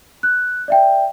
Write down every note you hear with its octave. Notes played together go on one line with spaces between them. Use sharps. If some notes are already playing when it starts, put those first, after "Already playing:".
F#6
D5 E5 G5